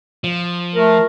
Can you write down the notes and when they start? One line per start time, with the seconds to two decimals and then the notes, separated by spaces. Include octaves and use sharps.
0.24 F3
0.75 A3 A#4